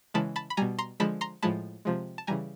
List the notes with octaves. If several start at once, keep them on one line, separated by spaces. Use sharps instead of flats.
C#3 E3 G#3 A5 B5
A5 B5
B5
B2 G3 G#5 A#5
A#5 C6
D3 F3 G#3 A5 B5
A#5 C6
A2 F3 G#3 A5 B5
C3 F3 G#3
A5
C#3 E3 G3 G#5 A#5